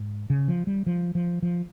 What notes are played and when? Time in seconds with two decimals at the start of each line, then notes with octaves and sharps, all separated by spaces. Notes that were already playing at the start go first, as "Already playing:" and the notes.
Already playing: G#2
0.30 C#3
0.48 F3
0.67 G3
0.86 F3
1.15 F3
1.42 F3